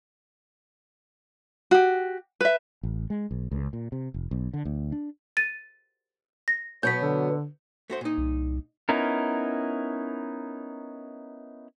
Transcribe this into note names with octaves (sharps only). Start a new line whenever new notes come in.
F#4 G4
B4 E5
A1
G#3
B1
C#2
A#2
C3
F1
B1
D3
D2
D4
A6 D#7
A#6
B2 F#3 B3 C#5 G6 B6
D3
A3 F#4 C5
A#2 D#4
C2
B3 C#4 D#4 E4 A#4